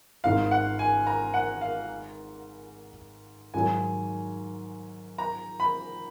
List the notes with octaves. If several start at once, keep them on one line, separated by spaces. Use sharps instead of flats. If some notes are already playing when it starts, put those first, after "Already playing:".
G#1 G#2 D#3 F5
F#5
G#5
A#5
F#5
F5
G#2 D#3 F#3 G#5
A#5
B5